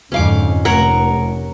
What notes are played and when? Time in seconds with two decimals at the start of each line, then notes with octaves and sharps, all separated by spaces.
0.12 F2 G#2 D3 C#4 F5 D6
0.65 F1 A#4 C#5 F#5